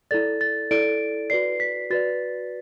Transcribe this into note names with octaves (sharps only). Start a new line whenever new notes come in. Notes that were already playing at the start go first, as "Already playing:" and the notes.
E4 A4 D5 A6
A6
E4 A4 D5 D7
F#4 B4 D5 C7
B6
F#4 B4 D5 A6